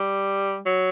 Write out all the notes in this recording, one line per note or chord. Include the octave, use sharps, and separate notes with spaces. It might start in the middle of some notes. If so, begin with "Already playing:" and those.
Already playing: G3
F#3